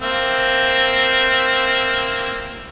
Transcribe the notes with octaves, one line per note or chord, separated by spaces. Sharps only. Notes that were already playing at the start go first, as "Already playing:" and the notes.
A#3 C4 E5